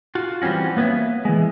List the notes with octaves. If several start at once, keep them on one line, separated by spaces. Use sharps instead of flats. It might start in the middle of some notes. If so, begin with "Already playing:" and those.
F4 F#4
E3 G3 C4 C#4 F#4
A#3 B3 B4 C#5 E5
E3 G#3